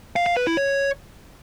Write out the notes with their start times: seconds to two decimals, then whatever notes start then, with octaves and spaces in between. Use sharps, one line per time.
0.16 F5
0.26 F5
0.37 B4
0.47 E4
0.57 C#5